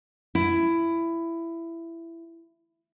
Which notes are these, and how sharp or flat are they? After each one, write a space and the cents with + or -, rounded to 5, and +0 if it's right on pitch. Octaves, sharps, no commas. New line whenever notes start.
E4 +15